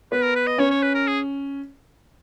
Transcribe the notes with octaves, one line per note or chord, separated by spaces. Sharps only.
B3 B4
A#4
B4
D#5
C#4 C#5
C#5
B4
A#4
G#4